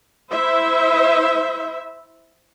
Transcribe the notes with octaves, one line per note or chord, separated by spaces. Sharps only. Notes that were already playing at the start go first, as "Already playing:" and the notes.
E4 C5 E5